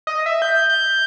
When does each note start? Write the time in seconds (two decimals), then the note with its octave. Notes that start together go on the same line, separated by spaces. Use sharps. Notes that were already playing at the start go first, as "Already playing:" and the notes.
0.07 D#5
0.26 E5
0.42 G6
0.70 G6